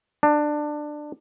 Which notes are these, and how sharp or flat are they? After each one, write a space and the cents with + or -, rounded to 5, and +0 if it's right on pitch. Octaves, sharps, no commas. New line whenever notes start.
D4 +20 A5 +25